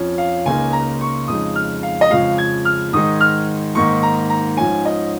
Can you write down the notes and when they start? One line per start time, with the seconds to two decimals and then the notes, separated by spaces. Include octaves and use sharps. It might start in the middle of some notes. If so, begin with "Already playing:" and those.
Already playing: F2 F3 C#4
0.18 F5
0.45 C#2 C#3 A#3 D#4 G#5
0.73 A#5
1.01 C#6
1.28 F2 C#3 G#3 D#4 D#6
1.56 F6
1.83 F5
2.01 D#5
2.10 F2 C#3 F3 G#3 F5
2.38 G#6
2.65 F6
2.93 G#2 D#3 G#3 D#4 D#6
3.21 F6
3.75 G#2 D#3 A#3 D#4 C#6
4.03 A#5
4.30 A#5
4.57 G#2 F3 C#4 G#5
4.85 D#5